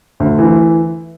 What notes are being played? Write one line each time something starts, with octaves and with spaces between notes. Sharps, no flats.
D2
E3